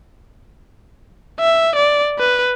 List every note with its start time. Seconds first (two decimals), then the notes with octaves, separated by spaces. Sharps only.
1.40 E5
1.76 D5
2.19 B4